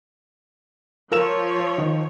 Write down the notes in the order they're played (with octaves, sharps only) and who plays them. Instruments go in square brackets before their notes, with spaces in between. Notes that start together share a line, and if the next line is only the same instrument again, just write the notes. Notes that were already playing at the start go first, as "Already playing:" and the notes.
[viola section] F3 C#5 [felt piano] A#4 E6 E7
[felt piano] D#3